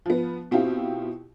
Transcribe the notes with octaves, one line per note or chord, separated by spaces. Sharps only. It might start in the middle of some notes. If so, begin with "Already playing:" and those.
F3 B3
B2 C4 E4 F4 G4